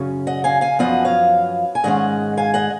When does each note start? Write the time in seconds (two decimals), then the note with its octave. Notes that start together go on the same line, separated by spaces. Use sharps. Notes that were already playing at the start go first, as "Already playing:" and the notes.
Already playing: F#2 C#3 C#4
0.27 D#5 F#5
0.44 F5 G#5
0.61 F5 G#5
0.79 F#2 F3 B3 F4 D#5 F#5
1.05 C#5 F5
1.75 G#5
1.84 G#2 D#3 G#3 C#4 D#5 F#5
2.37 F5 G#5
2.54 D#5 F#5